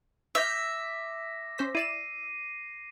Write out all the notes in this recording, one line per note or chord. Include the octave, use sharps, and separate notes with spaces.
E5 D6 F6 G6 A#6
C#4 C5 B6
E4 D5 C7 D#7 E7